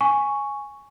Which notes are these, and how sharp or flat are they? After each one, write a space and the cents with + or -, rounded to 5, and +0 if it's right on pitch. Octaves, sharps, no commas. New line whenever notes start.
G#5 +0 C#6 +0